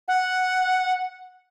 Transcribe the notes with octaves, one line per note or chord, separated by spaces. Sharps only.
F#5